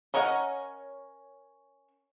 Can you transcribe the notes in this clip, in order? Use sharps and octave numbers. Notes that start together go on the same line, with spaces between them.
C#4 A#4 C#5 D#5 F#5